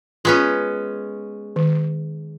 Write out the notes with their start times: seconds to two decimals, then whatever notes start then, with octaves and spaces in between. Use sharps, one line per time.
0.25 G#3 B3 C#4 F4
1.56 D#3